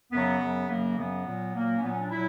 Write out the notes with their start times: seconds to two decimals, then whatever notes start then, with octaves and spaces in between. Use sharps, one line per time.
0.12 F#2 C#3 F#3 B3
0.41 F#2 C#3 F#3
0.69 F#2 C#3 F#3 A#3
0.97 F#2 C#3 F#3 B3
1.25 A#2 F#3
1.54 A#2 F#3 A#3
1.76 C#4
1.82 A#2 F#3 B3
1.92 C#4
2.01 D4
2.11 A#2 F#3 E4